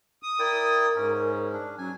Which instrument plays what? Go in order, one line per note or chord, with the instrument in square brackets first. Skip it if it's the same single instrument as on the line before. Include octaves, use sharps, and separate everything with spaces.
[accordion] D#6
[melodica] E4 D5 G5 [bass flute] A#4
[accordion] G#2 [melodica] C#4
[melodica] D4
[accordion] F#3 [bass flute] C#4 [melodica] G#5